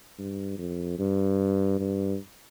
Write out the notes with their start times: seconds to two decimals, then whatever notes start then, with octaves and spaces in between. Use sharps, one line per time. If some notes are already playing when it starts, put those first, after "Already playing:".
0.19 G2
0.58 F2
0.99 G2
1.80 G2